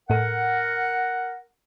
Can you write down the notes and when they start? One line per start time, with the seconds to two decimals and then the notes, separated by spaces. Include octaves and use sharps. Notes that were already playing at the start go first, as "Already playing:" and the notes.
0.10 A2 A4 A#4 F#5